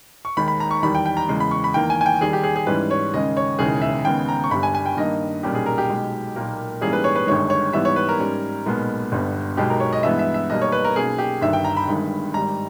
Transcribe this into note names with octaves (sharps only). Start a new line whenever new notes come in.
C#6
D#2 D#3 G#3 B5
B5
A#5
C#6
E2 D#3 G3 B5
G5
G5
A#5
E2 C#3 G#3
B5
C#6
B5
E2 D#3 A#3 G5
G#5
G#5
G5
D#2 D#3 G3 G#4
G4
G#4
G#4
G#2 E3 G3 C#4 B4
C#5
D#2 C#3 G#3 C#4 D#5
C#5
E1 D#2 C#3 E3 G#3 G#4
E5
D#2 C#3 G#3 B3 G5
A#5
C#6
G1 G2 G3 B5
G#5
G#5
G5
G2 D#3 A#3 D#5
B1 A#2 G3 C#4 G4
G#4
A#4
G4
B1 B2 G#3
B1 A#2 A#3
G#2 E3 G3 A#3 C#4 G#4
B4
C#5
B4
G1 G2 D#3 G#3 C#5
C#5
G#2 E3 G3 B3 E5
C#5
B4
A#4
G#2 G3 C#4
B1 A#2 G#3 B3
G1 G2 G3 B3
B1 B2 G#3 G4
A#4
C#5
D#5
G2 E3 G#3 B3 E5
E5
E5
B1 B2 G3 A#3 D#5
C#5
B4
A#4
B1 B2 A#3 C#4 G#4
G4
G1 G2 D#3 E5
G5
A#5
B5
G1 G2 D#3 G#3
G#1 G#2 G3 A#5